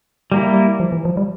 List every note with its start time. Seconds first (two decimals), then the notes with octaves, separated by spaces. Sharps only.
0.32 G3 A#3 E4
0.80 F3
0.92 E3
1.05 F3
1.17 G3